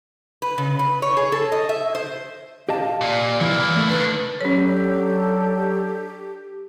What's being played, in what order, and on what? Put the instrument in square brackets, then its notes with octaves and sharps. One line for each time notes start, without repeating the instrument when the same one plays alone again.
[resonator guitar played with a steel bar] B4
C#3
B4
C#5
G#4
A4
D#5
E5
C5
[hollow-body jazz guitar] G4 D#5 A5 [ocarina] F5
[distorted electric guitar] A#2 [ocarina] D5
[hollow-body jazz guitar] E3 [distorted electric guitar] A#3 E4
[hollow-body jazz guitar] A3
[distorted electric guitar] D#3 D4 [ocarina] B4
[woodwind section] F#3 [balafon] C#4 C#5 [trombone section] D4 A4 [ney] G4